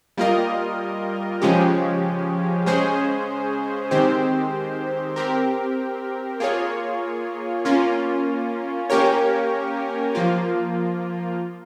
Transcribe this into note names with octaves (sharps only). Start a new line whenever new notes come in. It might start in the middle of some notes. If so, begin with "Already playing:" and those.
G3 A#3 F4 A#4 D#5
C#3 F3 G#3 C#4 G4
C#3 G#3 C#4 G#4 C5
D#3 G#3 C4 G4 C5
C4 G4 A#4
A#3 F4 G#4 C#5
A#3 C#4 F4
A#3 C#4 G4 A#4 C#5
F3 A#3 F4